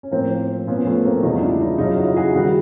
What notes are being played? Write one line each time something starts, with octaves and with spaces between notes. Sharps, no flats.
C#4
A2 F3 A#3 C4
A#2 F3 B3 C#4
A3 B3
A#3 C4
E2 C#3 E3 G3 D#4 F4
D4 E4
D#4 F4
F#2 C#3 F#3 D#4 F4
E4 F#4
F#4 G#4
D#3 G3 F#4 G#4